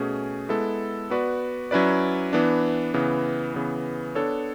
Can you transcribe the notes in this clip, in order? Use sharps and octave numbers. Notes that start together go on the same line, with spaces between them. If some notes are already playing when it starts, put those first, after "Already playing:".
Already playing: B2 A3 C#4 G#4
G#3 B3 E4 A4
B3 F#4 B4 D5
F#3 C#4 E4 B4 D5
E3 B3 D4
C#3 E3 B3
C#3 E3 B3
B3 D4 A4 C#5